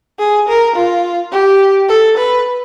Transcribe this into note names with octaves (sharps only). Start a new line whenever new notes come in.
G#4
A#4
F4
G4
A4
B4